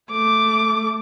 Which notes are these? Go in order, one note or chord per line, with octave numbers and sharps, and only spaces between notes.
A3 D6